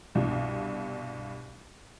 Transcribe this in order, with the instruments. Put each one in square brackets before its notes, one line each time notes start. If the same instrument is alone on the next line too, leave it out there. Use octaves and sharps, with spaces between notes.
[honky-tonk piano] C2 G2 B2